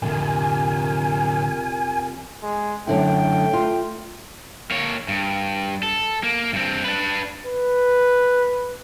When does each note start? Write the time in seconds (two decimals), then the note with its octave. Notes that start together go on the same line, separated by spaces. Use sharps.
0.02 F1 A2 D3 A#4 G#5
2.43 G#3
2.87 F#2 D3 A3 E4 G5
3.53 F4
4.71 A#3 C#5
5.08 G2
5.83 A4
6.23 A#3
6.53 G2 C4
6.84 D4 B4
7.46 B4